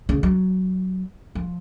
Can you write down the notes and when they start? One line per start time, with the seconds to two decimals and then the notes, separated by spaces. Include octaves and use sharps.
0.09 C#3
0.23 F#3
1.35 F3